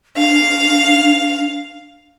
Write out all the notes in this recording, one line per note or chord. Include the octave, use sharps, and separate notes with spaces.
D4 F5